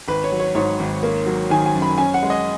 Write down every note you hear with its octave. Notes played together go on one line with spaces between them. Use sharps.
G#1 B4
C#5
F#3
C#5
G#2 C#5
G#1
A#3
F#3
D#3 G#5
G#5
F#2
B5
C#4 G#5
F#5
G#3
D#5